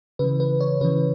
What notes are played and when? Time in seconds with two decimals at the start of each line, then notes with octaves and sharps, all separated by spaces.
0.19 C#3 E3 B4
0.40 B4
0.60 C#5
0.81 C#3 E3 B4